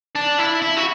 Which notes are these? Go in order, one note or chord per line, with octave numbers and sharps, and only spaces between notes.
D4
E4
E4
F#4